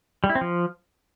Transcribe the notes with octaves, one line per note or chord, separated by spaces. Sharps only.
G3
E4
C4
F3